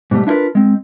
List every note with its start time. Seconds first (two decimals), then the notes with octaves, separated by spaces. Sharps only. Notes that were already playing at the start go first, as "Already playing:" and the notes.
0.11 G#2 B2 F#3 G3 A3
0.27 D4 E4 F4 A#4 B4
0.55 G#3 C4